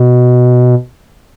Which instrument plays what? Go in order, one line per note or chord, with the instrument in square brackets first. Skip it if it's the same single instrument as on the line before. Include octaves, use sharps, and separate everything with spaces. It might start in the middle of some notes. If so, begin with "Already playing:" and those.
Already playing: [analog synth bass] B2